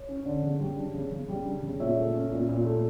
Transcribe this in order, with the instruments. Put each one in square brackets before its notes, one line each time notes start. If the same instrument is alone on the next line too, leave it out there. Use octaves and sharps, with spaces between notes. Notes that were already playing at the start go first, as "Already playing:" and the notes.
Already playing: [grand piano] C#5
C#4
D3
C#3
G3
D4
C#3
C#3
G3
D4
C#3
A#2 C#5 E5
A3
C#4
A#2
A#2
A3